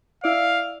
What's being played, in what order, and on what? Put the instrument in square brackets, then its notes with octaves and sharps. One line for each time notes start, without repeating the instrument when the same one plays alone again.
[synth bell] E4 D5 [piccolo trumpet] F5